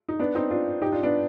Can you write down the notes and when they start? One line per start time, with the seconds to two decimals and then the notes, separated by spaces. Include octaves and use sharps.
0.09 D#4
0.19 B3 D4
0.35 C4 D#4
0.50 D4 F4
0.82 D#4 G4
0.92 D4 F4
1.03 B3 D4